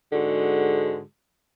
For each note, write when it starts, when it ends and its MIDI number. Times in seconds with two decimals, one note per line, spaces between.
0.13 1.01 44
0.13 1.01 50
0.13 1.01 56
0.13 1.01 66